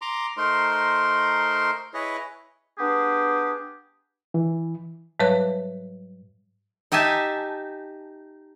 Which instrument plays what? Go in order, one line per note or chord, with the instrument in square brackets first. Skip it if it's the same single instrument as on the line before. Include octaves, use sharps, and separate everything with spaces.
[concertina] A#5 C6 D6
A3 D#4 A#4 C5 C6
E4 G#4 B4 C#5 D#5
[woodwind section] B3 D4 G4 G#4
[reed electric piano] E3
[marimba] G#2 F#3 G3 B4 C#5 F#6
[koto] D#4 G4 E5 G#5 A5